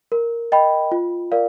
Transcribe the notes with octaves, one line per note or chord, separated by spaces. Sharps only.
A#4
D#5 G5 B5
F4
A#4 D5 F5